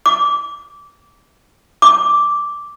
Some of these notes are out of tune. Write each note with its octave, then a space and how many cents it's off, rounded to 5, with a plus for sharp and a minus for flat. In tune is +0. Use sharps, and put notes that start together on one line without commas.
D6 -20
D6 -5